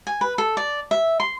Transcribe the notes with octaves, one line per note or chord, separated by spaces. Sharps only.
G#5
B4
A4
D5
E5
C6